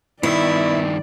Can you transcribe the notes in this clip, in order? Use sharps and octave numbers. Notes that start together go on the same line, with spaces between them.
G2 D#3 B3 E4 D5 E5